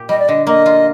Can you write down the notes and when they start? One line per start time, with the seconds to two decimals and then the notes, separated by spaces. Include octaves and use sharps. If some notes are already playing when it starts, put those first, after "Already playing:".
Already playing: A#2 G4
0.09 G3 D#5
0.19 D5
0.28 D3 D#5
0.47 A#3 D#5
0.66 F4